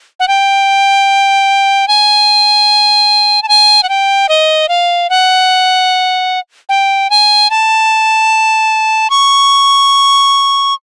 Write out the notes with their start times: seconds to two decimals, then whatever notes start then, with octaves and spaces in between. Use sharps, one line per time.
0.20 F#5
0.28 G5
1.88 G#5
3.43 A5
3.48 G#5
3.83 F#5
3.89 G5
4.29 D#5
4.69 F5
5.10 F#5
6.69 G5
7.10 G#5
7.50 A5
9.10 C#6